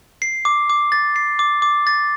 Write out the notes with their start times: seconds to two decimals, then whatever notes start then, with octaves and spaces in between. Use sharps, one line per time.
0.22 C7
0.45 D6
0.70 D6
0.92 A6
1.16 C7
1.39 D6
1.62 D6
1.87 A6